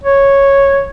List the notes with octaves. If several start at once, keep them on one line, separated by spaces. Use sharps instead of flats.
C#5